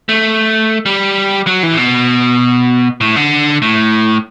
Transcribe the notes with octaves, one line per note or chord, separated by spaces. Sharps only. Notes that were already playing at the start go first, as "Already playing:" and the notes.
A3
G3
F#3
E3
A2
B2
A2
D3
A2